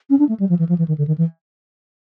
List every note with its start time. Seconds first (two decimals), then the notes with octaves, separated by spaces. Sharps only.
0.09 C#4
0.19 D4
0.29 A3
0.39 G3
0.49 F3
0.59 E3
0.69 F3
0.78 E3
0.88 D#3
0.98 D3
1.07 D#3
1.18 E3